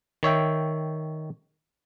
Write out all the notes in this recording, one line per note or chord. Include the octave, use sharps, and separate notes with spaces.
D#3 C#5 E5 G5